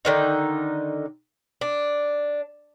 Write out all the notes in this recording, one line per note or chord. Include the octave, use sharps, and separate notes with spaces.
D3 D#3 D#4
D4